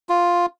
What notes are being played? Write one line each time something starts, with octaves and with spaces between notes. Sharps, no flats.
F4